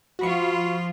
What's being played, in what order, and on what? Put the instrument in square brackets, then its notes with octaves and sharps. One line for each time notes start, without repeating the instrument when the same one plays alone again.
[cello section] F3 F4 [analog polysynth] F#4 B5 C#6